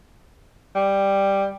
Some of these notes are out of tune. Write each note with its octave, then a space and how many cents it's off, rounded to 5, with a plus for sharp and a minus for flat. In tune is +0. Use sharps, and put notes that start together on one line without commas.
G3 +5